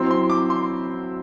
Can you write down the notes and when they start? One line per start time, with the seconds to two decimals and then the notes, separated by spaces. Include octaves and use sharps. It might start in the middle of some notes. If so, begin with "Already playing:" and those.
Already playing: F#3 C4 E4 C6
0.11 C6
0.30 D6
0.50 C6